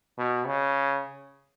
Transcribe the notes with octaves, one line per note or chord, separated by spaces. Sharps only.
B2
C#3